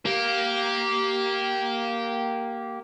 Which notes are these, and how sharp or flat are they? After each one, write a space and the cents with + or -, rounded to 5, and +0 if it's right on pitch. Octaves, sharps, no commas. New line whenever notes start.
A#3 +0 G4 -15